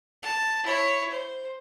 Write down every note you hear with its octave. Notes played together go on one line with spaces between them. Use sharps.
A5
E4 C#5
C5